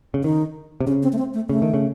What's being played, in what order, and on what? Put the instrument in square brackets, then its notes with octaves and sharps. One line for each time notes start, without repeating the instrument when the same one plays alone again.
[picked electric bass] C#3
[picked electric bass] D#3 [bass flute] D#4
[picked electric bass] C3
[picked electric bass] C#3 [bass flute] C#4
[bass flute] C4
A3
C4
A3
[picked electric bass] C#3 [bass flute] A3
[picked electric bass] D#3
C#3